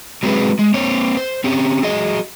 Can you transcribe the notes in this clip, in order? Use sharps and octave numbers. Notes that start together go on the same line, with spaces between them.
F#3 G#3 C4 G#4 B4
G#3
A#3 C4 C#5
C5
C4 C#4 G4
F#3 G#4 D#5